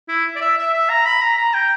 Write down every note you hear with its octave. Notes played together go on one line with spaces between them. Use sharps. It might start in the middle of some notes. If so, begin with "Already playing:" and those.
E4
D5
E5
E5
E5
A#5
B5
A#5
A#5
G5